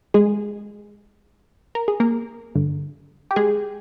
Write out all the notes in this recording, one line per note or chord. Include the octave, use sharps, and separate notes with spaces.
G#3 G#4
A#4
G#4
A#3 A#4
G2 D3
G4
G#3 G#4